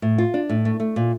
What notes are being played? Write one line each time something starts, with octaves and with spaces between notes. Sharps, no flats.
A2
F4
D4
A2
A3
A3
A#2